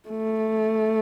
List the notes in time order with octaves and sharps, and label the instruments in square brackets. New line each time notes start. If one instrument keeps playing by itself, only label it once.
[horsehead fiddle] A3